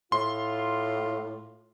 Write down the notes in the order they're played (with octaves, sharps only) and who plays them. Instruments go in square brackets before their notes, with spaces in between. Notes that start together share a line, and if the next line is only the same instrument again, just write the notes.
[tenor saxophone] A2 [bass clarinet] F4 [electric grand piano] C6